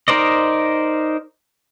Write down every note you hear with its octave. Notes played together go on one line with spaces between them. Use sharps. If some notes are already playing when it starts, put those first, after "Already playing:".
D#4 A#4 C5 D5 D#5